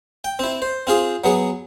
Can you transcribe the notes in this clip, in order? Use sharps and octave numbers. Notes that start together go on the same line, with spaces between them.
G5
C4 E4
C5
C4 F4 G#4
F#3 B3 G#4